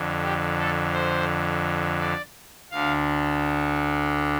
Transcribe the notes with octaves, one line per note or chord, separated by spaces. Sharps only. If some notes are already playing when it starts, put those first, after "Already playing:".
Already playing: F2 D3
G4
A4
C5
D5
D2 D3 F5